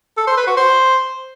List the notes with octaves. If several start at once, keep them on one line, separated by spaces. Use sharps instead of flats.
A4
C5
B4
F#4
C5